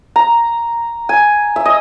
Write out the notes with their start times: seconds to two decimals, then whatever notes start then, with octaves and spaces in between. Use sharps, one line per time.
0.16 A#5
1.09 G#5
1.56 E5
1.65 D#5